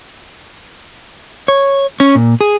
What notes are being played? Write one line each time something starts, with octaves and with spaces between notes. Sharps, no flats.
C#5
C#4 C#5
A#2
G#4